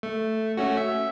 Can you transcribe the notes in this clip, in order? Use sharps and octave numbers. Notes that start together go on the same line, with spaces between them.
A3
A3 C#4 F#4
E5